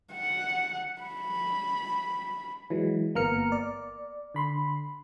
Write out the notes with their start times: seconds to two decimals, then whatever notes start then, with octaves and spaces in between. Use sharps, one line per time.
0.13 F#5
1.02 B5
2.70 E3 F#3 G#3
3.15 G1 A#3 B3 A#5 F6 C#7
3.52 D5
4.34 D3 B5 C6